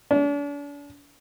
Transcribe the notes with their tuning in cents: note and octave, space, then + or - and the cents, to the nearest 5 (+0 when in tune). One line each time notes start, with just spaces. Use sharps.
D4 -40